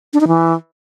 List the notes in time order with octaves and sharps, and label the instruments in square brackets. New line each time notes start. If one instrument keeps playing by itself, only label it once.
[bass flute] D4
D#4
E3